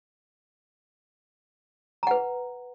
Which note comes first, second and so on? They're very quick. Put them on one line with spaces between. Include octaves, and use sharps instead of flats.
A#5 F#5 B4